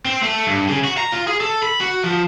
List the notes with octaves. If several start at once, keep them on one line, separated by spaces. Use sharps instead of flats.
C4
A3
G2
C#3
F#4
A#5
F4
G#4
A4
B5
F#4
F3